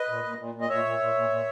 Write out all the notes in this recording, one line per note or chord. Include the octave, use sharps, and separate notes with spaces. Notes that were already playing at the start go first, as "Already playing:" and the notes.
Already playing: B4 D#5
A#2
A#2
A#2
A#2
D#5
A#2 C#5 E5
A#2
A#2
A#2
A#2